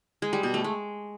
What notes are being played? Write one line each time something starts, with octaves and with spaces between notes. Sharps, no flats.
G#3
G3
B2
A3
G#3